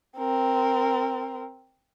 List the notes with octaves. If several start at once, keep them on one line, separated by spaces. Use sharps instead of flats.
C4 A#4